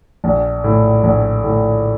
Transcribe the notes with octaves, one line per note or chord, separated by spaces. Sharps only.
A#1
A2
A#1
A2